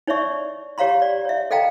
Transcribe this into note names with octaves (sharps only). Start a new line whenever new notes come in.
D#4 C#5 D5 E5 C#6
G4 C#5 F5 A#5 C6
D5
C#5 E5
A4 D#5 F5 G5 A5 A#5